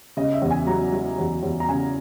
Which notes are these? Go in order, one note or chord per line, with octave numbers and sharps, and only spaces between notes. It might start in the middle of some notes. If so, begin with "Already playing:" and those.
C#3 D#5
E5
E2
G#5
F#3 A#5
F#3
E2
E2
A#5
C#3 G#5